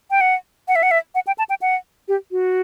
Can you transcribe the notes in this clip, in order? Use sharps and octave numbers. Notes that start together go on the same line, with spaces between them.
G5
F#5
F#5
E5
F#5
E5
F#5
G5
A5
G5
F#5
G4
F#4